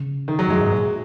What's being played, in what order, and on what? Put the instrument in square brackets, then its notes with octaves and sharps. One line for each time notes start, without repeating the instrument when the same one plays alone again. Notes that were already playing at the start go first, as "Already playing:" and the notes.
Already playing: [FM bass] C#3
[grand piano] D#3
F#3
[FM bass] F#2 [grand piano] G#3
[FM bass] G#2 [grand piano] G#3
[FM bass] A#2